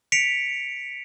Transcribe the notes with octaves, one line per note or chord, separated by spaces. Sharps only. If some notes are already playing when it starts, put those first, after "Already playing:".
B6 C#7 D7 F7